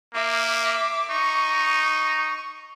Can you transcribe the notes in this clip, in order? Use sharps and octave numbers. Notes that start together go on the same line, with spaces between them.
A#3 E5 D6
D#4 C#6